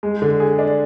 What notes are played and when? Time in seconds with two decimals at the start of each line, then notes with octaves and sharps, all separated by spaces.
0.03 G#3
0.22 D3
0.40 G#4
0.59 D4